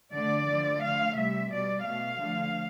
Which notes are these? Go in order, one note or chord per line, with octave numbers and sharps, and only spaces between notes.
D3 A3 D5
D3 F3 A3
D3 F3 A3 F5
C3 G3 E5
B2 G3 D5
B2 A3 F5
D3 F3 A3